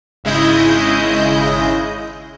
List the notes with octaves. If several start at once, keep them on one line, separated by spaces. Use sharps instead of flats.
G#1 C#3 G#3 E4 D#5 G6